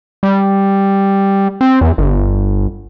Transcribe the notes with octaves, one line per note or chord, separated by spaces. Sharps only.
G3
C4
E2
G1